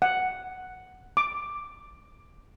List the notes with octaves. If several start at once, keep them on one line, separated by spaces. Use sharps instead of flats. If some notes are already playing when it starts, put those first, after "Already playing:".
F#5
D6